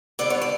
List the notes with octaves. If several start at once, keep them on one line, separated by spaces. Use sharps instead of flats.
D3 G3 B3 D5
C#5
D5